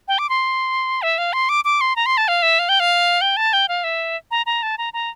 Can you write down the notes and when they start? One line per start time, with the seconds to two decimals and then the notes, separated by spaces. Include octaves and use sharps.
0.08 G5
0.19 D6
0.29 C6
1.02 E5
1.18 F5
1.33 C6
1.49 D6
1.65 D6
1.81 C6
1.96 A#5
2.06 C6
2.17 A5
2.28 F5
2.43 E5
2.59 F5
2.69 G5
2.80 F5
3.21 G5
3.37 A5
3.53 G5
3.68 F5
3.84 E5
4.31 A#5
4.46 A#5
4.63 A5
4.78 A#5
4.93 A#5